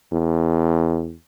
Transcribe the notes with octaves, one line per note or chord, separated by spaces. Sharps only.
E2